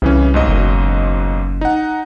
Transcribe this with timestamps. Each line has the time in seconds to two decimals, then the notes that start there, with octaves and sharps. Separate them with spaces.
0.02 C2 C#3 E3 C#4
0.34 B1 G#2 D#5
0.48 F#1
1.61 D#4 F#5